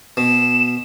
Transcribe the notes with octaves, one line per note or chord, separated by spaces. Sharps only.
B2 E7